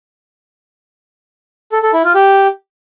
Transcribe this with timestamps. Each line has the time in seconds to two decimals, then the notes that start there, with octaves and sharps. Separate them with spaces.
1.72 A4
1.83 A4
1.93 E4
2.04 F4
2.15 G4